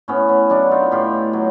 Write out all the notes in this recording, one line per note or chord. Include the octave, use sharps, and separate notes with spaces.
A2 B3 C#4
B3
F#3 D4 E4
D#4 F4
A2 F4 G4
F#3